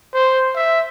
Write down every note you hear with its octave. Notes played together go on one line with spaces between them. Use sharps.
C5
E5